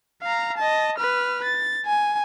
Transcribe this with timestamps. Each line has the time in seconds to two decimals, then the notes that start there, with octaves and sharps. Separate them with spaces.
0.22 F5 A#5
0.57 D#5 A5
0.98 B4 F6
1.44 A6
1.86 G#5